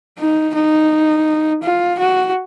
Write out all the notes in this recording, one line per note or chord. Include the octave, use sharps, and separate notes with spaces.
D#4
D#4
F4
F#4